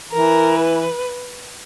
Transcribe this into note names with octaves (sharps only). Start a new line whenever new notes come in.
E3 A#4
B4